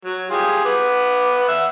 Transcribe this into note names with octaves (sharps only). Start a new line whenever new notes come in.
F#3
F4 G4 G#4
B4 F#5 D6
E5 F#5